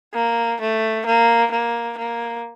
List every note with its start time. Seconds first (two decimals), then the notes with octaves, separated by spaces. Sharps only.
0.14 A#3
0.61 A3
1.06 A#3
1.51 A#3
1.98 A#3